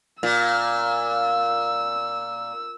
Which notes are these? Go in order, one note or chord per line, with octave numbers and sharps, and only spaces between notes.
A#2 E6